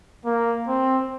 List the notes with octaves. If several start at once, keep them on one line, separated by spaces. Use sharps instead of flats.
A#3
C4